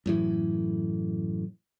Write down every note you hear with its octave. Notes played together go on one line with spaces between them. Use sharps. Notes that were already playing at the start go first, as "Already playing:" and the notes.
F#2 A2 E3